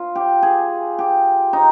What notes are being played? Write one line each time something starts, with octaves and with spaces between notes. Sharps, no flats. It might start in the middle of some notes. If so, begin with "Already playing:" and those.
Already playing: F4
G4
G#4
G4
D#4